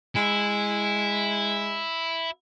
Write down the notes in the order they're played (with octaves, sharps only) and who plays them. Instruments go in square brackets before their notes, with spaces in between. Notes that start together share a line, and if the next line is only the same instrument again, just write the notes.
[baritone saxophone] G#3 [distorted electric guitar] E4